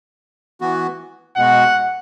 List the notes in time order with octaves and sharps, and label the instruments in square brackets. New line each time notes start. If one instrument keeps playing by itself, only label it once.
[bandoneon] E3 B3 F#4
[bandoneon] B2 G#3 B3 F#4 [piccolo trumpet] F#5